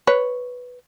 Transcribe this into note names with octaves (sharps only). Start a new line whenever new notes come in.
B4 C#5